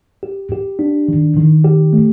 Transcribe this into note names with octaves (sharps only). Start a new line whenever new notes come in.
G4
G4
D4
D#3
D#3
G4
A3